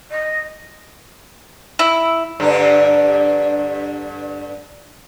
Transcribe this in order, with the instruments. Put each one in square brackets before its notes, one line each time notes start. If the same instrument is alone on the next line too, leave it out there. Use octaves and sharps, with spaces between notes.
[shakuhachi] D#5
[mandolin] E4
[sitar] G2 D3 D4